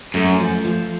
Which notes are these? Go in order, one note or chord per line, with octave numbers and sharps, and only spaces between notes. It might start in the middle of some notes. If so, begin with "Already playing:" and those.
F#2 A3
F3
F3